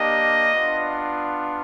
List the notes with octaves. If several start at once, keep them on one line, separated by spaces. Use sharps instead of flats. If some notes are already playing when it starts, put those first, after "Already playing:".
Already playing: A#3 D4 G4 D#5
B3 D4 F4